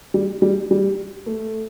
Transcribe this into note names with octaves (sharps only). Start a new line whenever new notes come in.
G3
G3
G3
A3